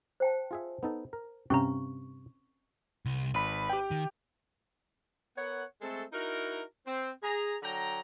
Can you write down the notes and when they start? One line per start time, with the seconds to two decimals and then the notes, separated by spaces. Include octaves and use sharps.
0.20 C5 G5 A5
0.51 F4 G#4 E5
0.83 B3 D#4 A4
1.13 A#4
1.50 G2 C3 C4 C#4 F5 A#5 C#6
3.05 C2
3.34 G#1 B4 B5
3.70 G4 G5
3.91 D#3
5.36 B3 A#4 C#5 F#5
5.81 G#3 A3 C4 A4
6.12 D#4 E4 F#4 A#4
6.86 C4
7.23 G#4 A#5
7.62 D3 F#3 G5 A#5